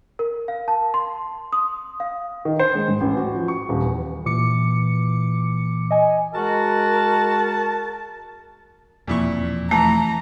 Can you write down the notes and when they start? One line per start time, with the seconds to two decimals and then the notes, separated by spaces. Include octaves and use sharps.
0.19 A#4
0.48 F5
0.68 A5
0.94 C6
1.52 D#6
2.00 F5
2.45 D#3
2.59 C5
2.75 G#3
2.88 G#2
3.01 A1
3.16 F#4
3.35 F3
3.48 C#6
3.69 D#1
3.83 E2
4.26 A#2 E3 D6 C#7
5.91 D#5 G#5
6.35 G#3 F#4 A#4 A5
9.07 E1 F2 A#2 E4 C#6
9.71 E3 A3 A#5